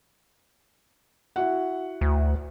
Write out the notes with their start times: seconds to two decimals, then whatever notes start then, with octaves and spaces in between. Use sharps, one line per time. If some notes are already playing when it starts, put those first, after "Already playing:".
1.36 E4 F#4 F#5
2.01 D2